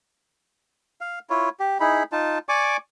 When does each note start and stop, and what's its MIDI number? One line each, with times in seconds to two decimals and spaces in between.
1.01 1.19 77
1.30 1.49 64
1.30 1.49 65
1.30 1.49 73
1.60 1.78 67
1.80 2.03 63
1.80 2.03 64
1.80 2.03 68
1.80 2.03 83
2.12 2.39 63
2.12 2.39 65
2.12 2.39 81
2.49 2.77 74
2.49 2.77 80
2.49 2.77 85
2.49 2.77 86